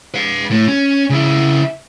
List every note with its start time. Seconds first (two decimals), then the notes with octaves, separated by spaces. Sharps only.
0.14 B4 F5
0.51 A2
0.68 C#4
1.10 C#3 E4